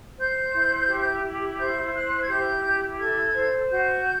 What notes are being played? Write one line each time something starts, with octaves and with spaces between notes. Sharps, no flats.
C5 G6
E4
G4
E4
C5 G6
E4 F#6
G#6
G4 G6
E4
A4 G#6
C5
F#4 G6